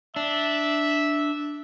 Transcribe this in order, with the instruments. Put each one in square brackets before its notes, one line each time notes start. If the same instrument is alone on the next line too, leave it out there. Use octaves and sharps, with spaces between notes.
[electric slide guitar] D4 [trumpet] E5